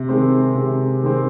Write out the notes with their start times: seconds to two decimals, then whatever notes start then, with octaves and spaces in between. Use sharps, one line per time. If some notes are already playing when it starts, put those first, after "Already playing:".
Already playing: C3
0.09 D#3 G#3 C4
0.55 C3
1.02 D#3 G#3 C4